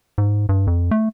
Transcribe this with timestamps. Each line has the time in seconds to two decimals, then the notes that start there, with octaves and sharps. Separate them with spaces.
0.18 G#2
0.49 G2
0.67 F2
0.91 A3